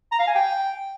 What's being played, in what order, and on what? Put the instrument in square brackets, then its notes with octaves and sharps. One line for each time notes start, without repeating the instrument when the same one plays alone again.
[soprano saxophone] A#5
F5
G#5
G5